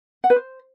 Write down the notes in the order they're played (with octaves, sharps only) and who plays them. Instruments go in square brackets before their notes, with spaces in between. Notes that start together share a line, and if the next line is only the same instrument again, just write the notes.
[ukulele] F#5
B4
C5